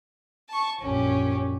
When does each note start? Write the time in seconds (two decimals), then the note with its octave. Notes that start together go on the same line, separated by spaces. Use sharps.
0.49 A5 C#6
0.81 A#1 F#2 C#4 G4